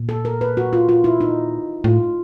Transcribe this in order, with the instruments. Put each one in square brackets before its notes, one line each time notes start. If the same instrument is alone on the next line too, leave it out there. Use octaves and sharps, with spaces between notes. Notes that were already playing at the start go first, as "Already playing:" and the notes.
Already playing: [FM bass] A#2
[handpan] A4
A#4
B4
F#4
F4
F4
E4
D#4
[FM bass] A2 [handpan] F4